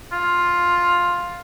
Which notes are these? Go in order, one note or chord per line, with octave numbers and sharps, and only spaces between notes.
F4